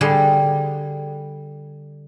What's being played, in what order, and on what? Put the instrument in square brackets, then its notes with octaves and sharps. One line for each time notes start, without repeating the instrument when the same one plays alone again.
[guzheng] D3 G3 G#4 C6